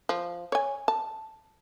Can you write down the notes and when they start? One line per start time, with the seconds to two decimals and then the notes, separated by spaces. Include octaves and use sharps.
0.09 F3
0.52 C#5 G#5
0.88 A5